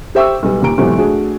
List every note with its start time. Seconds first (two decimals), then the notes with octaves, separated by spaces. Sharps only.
0.15 G4 C5 E5 G5 C#6 E6
0.43 B1 G3 B4
0.62 D#2 A#2 G4 A#5 D7
0.78 G#1 B2 E3 F#3 G4 A4
0.97 A3 D4 F#4 G#4